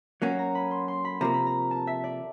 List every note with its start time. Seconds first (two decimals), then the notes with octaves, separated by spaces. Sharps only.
0.22 F#3 A#3 C#4 F#4
0.39 A#5
0.55 B5
0.71 C6
0.88 C6
1.05 B5
1.21 C3 F3 A#3 A#5
1.34 B5
1.46 A#5
1.71 A5
1.87 E5
2.04 D5